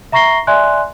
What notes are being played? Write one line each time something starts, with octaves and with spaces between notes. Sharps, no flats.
E5 A#5 C#6 A#6 C7 G7
D5 E5 G#5 C6 F#6